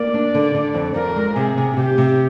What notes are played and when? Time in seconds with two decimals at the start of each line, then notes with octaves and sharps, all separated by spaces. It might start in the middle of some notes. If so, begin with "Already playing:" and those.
Already playing: A#3 D5
0.14 D4
0.35 D3
0.55 D3
0.74 F2
0.95 F2 A#4
1.16 G#3
1.36 C3 G#4
1.57 C3
1.77 C3 G4
1.98 C3